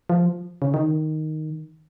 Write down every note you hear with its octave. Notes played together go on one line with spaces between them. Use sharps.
F3
C#3
D#3